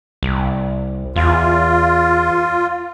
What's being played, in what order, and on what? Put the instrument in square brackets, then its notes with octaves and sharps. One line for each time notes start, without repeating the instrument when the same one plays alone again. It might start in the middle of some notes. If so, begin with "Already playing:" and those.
[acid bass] C2
[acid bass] E2 [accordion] F4